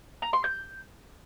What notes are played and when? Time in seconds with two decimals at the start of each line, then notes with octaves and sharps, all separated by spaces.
0.22 A#5
0.33 C6
0.44 G6